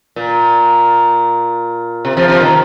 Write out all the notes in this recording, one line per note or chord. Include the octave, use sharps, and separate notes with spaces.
A#2
C3
C3 F3
C3 F3
A#2 D#3